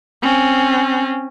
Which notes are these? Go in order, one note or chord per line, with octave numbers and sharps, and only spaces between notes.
C4 C#4